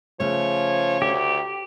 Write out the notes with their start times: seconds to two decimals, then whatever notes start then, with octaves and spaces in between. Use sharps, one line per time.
0.20 C#3 F3 A3 C#5
1.02 D2 G4